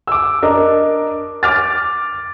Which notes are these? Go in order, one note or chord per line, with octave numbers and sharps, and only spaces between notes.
D6 E6
D4 A#4 D#5
D6 F6 A6